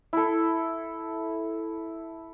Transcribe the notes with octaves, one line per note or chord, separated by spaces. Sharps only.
E4 A4